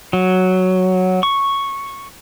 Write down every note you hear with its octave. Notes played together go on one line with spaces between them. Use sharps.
F#3
C#6